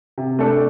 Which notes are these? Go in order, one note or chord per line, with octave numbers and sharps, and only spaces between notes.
C3
A3 D4 A4 D5